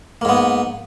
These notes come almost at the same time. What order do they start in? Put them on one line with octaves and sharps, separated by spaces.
A#3 G#2 B3